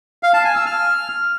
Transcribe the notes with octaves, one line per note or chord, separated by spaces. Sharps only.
F5
A5
G#5
E6
F6